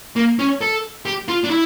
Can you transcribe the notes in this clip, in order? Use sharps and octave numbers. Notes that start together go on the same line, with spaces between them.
A#3
C#4
A4
G4
F4
D4
E4